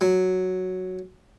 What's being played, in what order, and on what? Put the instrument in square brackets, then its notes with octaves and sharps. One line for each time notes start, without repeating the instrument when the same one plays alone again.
[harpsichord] F#3